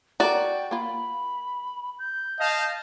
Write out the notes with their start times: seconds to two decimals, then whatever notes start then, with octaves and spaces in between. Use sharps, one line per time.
0.20 F#4 A4 A#4 D5 G5
0.71 A#3 F4 B5
1.99 G6
2.38 D#5 F5 A5